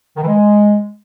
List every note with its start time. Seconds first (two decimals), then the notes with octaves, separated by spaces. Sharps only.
0.16 D#3
0.22 E3
0.28 G#3